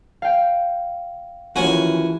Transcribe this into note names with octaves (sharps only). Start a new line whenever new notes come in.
F5 G5
D#2 E3 F3 C#4 F#4 G#5